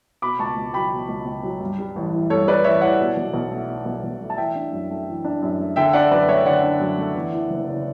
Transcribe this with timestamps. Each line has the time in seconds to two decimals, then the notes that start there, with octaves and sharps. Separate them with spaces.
0.22 B2 B5 D6
0.39 C#2 A5 C#6
0.56 C#2
0.74 F#3 G5 B5
0.92 B2
1.08 C#2
1.26 C#2
1.43 F#3
1.60 G2
1.79 G3
1.96 A1
2.12 E3
2.30 G2 A4 C#5
2.47 G3 B4 D5
2.64 A1 C#5 E5
2.81 E3 D5 F#5
3.00 B2
3.17 B1
3.34 B1
3.51 A3
3.69 B2
3.86 B1
4.04 B1
4.21 A3
4.30 A5
4.38 E3 E5 G5
4.55 D4
4.73 F#2
4.91 A3
5.08 E3
5.25 D4
5.42 F#2
5.60 A3
5.76 D3 E5 G5
5.93 D4 D5 F#5
6.11 F#2 B4 D5
6.28 A3 C#5 E5
6.45 D3 D5 F#5
6.63 D4
6.80 F#2
6.98 A3
7.15 E2
7.33 E3
7.50 F#1
7.68 C#3